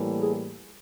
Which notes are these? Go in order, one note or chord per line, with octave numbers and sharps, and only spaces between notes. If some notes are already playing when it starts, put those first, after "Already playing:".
Already playing: A2 E3 G3 A#3
G#4